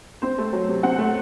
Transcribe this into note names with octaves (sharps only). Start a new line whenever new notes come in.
C4 C5
A3
F#3
C3
C4 F#5
A3